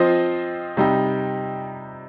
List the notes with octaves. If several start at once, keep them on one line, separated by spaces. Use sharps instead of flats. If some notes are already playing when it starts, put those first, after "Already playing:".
Already playing: F3 C4 F4 C5 D#5
C3 G3 D#4 G4